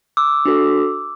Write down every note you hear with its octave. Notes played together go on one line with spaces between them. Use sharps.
D6 E6
D4 F#4 A4